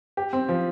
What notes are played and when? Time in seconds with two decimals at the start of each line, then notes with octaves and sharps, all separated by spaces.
0.17 G4
0.33 C4
0.49 F3